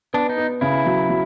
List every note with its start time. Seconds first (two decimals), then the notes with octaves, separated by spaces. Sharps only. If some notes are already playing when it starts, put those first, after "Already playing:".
0.14 B3 D4
0.29 D#4
0.38 B3
0.61 C#3 E4
0.85 F#3
1.09 F#3